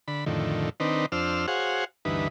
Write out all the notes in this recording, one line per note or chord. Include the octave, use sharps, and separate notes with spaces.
D3 B5
F2 A2 D3 D#3
D#3 C4 D4 D#4 B4
F2 D4 C5 E6 F6
F#4 G#4 C5 C#5 F5 F#5
D2 G2 E3 D#4 B4